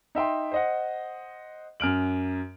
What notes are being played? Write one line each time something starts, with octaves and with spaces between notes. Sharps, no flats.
D#4 E5 G5 C6
C5 D#5 F#5
F#2 F6 D7 F#7